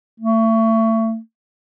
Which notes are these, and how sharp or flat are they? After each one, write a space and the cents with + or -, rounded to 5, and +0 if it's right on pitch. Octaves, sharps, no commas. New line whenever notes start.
A3 +30